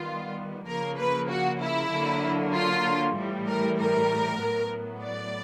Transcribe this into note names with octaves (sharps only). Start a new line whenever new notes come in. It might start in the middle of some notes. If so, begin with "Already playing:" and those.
Already playing: D#3 G3 B3 F4
C#3 F3 A#3 A#4
B4
F#4
E4
D3 F#3 A#3
F4
A2 E3 G3
A#4
A#4
A2 F#3 B3
D5